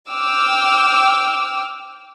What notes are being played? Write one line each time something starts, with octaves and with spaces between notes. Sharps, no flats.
G5 D6 E6 F6